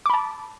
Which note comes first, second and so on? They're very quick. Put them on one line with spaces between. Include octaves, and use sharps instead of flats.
D6 B5 A5